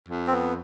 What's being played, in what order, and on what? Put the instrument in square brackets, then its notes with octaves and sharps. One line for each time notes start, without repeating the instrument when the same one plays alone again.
[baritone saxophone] F2
[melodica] C4
B3